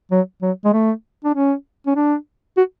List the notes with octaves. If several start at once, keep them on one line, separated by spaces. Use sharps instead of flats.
F#3
F#3
G#3
A3
D4
C#4
C#4
D4
F#4